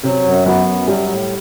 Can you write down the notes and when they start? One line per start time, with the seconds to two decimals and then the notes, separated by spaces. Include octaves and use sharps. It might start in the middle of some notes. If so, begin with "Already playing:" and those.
0.03 C3 F#3
0.25 F#2
0.46 F#3 B3
0.67 F#2
0.88 F#3 G3
1.08 A2